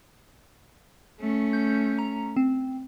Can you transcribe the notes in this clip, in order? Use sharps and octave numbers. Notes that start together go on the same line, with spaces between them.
A3 C#4
G6
A#5
C4